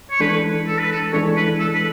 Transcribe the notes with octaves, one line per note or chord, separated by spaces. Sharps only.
C#5
E3 G#3 D4 A4 B4
A4
B4
A4
E3 G#3 D4 A4 C#5
B4
A4
B4